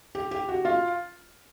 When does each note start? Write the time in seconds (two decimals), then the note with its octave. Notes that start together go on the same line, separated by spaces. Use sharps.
0.15 G4
0.31 G4
0.49 F#4
0.65 F4